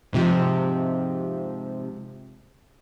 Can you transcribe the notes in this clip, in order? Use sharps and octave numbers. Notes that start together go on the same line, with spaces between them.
G#2 C3 F3